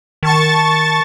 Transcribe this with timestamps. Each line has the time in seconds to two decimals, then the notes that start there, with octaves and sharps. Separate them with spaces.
0.23 D#3 A5 C#6 A6